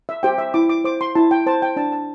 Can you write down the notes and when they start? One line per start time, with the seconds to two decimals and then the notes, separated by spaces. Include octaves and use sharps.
0.09 E5
0.23 G4 C5 G5
0.38 E5
0.54 E4 D6
0.70 D6
0.84 C5 D6
1.01 C6
1.15 E4 A5
1.31 G5
1.46 C5 A5
1.62 G5
1.76 D4 A5
1.92 A5